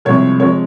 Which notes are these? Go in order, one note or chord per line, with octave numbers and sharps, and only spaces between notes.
C2 C3 F3 G#3 C#5
C3 F3 G#3 C#5